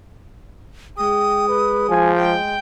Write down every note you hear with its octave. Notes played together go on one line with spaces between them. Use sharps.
G#3 G5 D#6
B4
F3 G#5
G#3 G5